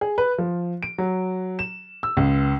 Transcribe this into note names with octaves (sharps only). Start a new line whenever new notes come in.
G#4
B4
F3
D7
F#3
E7
E6
C#2